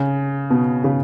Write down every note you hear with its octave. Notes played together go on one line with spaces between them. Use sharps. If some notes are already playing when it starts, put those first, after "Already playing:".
Already playing: C#3
B2
C#3